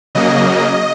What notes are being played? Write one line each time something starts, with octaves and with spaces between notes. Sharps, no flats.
C#3 F#3 A#3 D#5